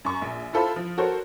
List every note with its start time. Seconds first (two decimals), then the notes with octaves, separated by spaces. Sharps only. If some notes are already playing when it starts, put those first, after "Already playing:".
0.05 F#2 C#6
0.22 A#1
0.53 E4 F4 A4 C5 E5 B5
0.76 F3
0.98 F#4 A4 A#4 C5 C#5